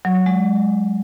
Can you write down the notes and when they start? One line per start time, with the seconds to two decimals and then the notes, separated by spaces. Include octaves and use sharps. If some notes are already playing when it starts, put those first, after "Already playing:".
0.05 F#3
0.26 G#3